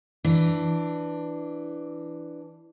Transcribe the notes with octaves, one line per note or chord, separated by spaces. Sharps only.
E3 D4